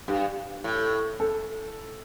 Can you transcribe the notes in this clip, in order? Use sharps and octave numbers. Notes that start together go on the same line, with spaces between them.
G2 G4
A2
A4